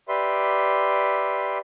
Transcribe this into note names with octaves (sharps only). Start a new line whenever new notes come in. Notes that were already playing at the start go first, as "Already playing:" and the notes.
G4 B4 D5 E5 C6